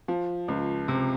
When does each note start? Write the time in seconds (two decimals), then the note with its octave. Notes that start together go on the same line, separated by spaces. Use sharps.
0.08 F3
0.48 C#2
0.88 C3